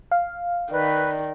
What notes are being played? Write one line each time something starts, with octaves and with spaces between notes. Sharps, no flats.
F5
D#3 B4 D5